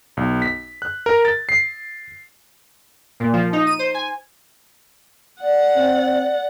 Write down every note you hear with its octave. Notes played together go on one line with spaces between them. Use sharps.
B1
B6
F#6
A#4
A6
C7
A#2
F3
D#4
D#7
C5
G#5
D5 F#5
C4